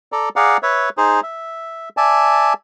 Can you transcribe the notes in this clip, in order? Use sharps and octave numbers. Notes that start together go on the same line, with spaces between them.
A4 D5 A#5
G#4 D5 F5 F#5 A#5
B4 C#5 E5
D#4 G#4 C5
E5
D5 E5 G#5 A5